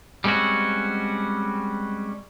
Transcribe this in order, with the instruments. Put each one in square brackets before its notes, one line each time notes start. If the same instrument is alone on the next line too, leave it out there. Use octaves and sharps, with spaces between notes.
[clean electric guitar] G3 G#3 C4 C#4 F#4